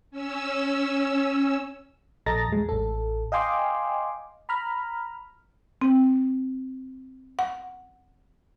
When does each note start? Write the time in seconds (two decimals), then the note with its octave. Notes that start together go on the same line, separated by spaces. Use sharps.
0.11 C#4 E6
2.26 A#1 A4 D#5 A#5 A6 A#6
2.49 E2 G#3
2.69 A1 A4
3.32 D#5 F5 G5 G#5 C6 D6
4.49 A#5 B5 F6
5.81 C4
7.39 F#5